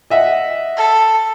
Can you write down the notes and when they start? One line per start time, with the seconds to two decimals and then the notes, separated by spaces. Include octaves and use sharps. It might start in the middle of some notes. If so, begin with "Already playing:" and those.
0.10 D#5 E5 F#5
0.77 A4